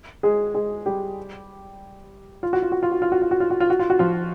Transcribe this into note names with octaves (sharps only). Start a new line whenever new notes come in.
G#3 G#4
G#3 G#4
G3 G4
F4
F#4
F4
F#4
F4
F#4
F4
F#4
F4
F#4
F4
F#4
F4
F#4
F4
F#4
F3 F4